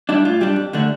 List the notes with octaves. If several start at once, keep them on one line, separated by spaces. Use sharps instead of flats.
G3 D4 E4
A2 F4
G3 D4 G4
F2
D3 A3 D4